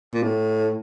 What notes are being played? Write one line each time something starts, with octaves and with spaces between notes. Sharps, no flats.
A#2
A2